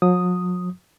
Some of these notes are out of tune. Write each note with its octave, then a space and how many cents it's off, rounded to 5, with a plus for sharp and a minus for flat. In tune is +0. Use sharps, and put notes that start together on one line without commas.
F#3 -45 D#6 +0